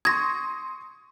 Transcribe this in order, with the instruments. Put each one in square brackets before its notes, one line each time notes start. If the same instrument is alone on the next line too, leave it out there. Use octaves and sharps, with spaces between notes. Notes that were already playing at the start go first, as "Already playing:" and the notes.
[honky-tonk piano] C6 C#6 D#6 [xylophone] G#6 A#6